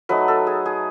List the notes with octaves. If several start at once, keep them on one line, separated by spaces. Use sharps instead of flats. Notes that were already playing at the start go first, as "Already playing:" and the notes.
F#3 A3 D#4 B4
A4
G#4
G#4